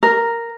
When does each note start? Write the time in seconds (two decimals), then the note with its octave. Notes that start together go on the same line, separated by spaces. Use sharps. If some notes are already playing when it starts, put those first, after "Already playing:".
0.03 A#4